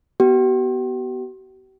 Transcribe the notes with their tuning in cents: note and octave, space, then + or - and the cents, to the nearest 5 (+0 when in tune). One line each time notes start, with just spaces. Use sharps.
B3 +0 G4 -45